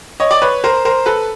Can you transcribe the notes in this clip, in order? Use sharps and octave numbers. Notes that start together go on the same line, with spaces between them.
C#5 D#5
D5
B4 C#5
A#4 C5
A#4 C5
A4 B4